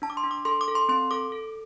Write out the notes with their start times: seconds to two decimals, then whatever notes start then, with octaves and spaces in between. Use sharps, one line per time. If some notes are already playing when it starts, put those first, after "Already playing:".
0.02 D4 A5
0.10 D6
0.17 C6
0.24 D4
0.31 D6
0.45 A4 C6
0.61 D6
0.68 A4
0.75 C6
0.89 C4 C6
1.11 A4 D6
1.32 A4